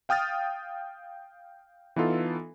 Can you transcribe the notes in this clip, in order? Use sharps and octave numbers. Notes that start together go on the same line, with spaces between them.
F5 G5 D#6 F6 A6
E3 B3 D#4 F4 A4